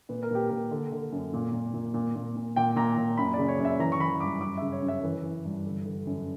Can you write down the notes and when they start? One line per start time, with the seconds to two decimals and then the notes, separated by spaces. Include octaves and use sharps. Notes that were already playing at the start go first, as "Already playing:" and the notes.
0.09 A#2 B4
0.23 A#4
0.31 A#2 G4
0.49 A#2 A#4
0.71 D3
0.92 D3
1.12 F#2
1.34 A#2
1.53 A#2
1.73 A#2
1.94 A#2
2.16 A#2
2.36 A#2
2.56 A#2 G5
2.76 A#2 A#5
2.97 A#2
3.17 F#2 B5
3.34 C#3 D5
3.48 C#5
3.59 F#2
3.65 E5
3.79 E3 A#5
3.92 C#6
4.00 E3 B5
4.20 G2 D6
4.41 F#2 D6
4.57 C#3 E5
4.72 C#5
4.83 F#2
4.88 E5
5.03 E3 B4
5.24 E3
5.45 G2
5.65 D3
5.86 D3
6.07 F#2